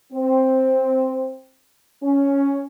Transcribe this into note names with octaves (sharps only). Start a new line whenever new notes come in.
C4
C#4